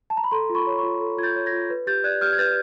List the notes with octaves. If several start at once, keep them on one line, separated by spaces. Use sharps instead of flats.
A5
A#5
B5
A4 A#5 C6
F4
B5 C#6
C#5
F4 B5 C#6
A4
F4 G#6
G6 A6
C#5
G#6 A#6
F4
B4
G4 G6 A6
D5 F#6 G#6
G4 F6 G6
G#6
B4 G6 A6